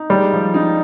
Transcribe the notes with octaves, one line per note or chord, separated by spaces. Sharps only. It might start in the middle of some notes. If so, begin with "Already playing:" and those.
Already playing: D#4
G3 G#3
F3
D#4